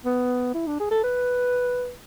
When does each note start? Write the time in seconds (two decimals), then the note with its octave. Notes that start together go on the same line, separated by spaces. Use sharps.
0.05 B3
0.54 E4
0.67 D4
0.80 G#4
0.91 A4
1.03 B4